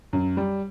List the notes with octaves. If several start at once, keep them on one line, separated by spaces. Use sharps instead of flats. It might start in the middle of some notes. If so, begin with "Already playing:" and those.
F#2
G3